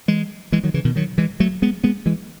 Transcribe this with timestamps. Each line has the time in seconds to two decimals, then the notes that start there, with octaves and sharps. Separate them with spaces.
0.08 E3 G#3
0.52 E3 G#3
0.64 D#3 F#3
0.74 C#3 E3
0.85 B2 D#3
0.96 D#3 F#3
1.18 E3 G#3
1.40 F#3 A3
1.62 G#3 B3
1.84 G#3 B3
2.06 E3 G#3